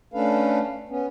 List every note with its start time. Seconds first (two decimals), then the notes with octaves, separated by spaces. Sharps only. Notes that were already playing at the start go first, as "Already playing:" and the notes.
0.14 A3 C#4 D4 A4 B4 F5
0.89 B3 C#4